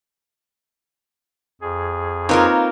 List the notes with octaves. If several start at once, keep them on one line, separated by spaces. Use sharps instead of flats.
F2 G#4
A#3 C4 D#4 F4 A#4 B4 C#5